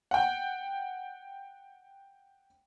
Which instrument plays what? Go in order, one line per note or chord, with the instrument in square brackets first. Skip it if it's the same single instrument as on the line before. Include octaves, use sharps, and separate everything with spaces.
[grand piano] F#5 G5